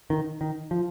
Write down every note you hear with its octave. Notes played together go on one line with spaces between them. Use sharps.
D#3
D#3
F3